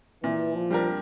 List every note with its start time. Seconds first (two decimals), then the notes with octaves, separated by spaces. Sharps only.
0.24 A#2 E3
0.55 F3
0.70 G3 D4 G4 A#4